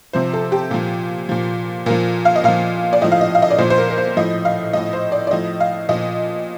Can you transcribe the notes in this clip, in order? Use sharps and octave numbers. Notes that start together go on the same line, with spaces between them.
C3 F3 C5
A4
G4
A#2 F3
A#2 F3
A#2 F3 A#4
F5
D#5
A#2 F3 F5
D5
A2 F3 D#5
F5
D#5
F5
D#5
D5
A#2 F3 C5
C5
A#4
A#4
C5
A2 F3 D#5
F5
A2 F3 D#5
C5
D5
D5
A2 F3 D#5
F5
A#2 F3 D#5